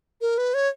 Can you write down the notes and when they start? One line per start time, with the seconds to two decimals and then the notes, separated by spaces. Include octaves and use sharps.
0.21 A#4
0.38 B4
0.54 C#5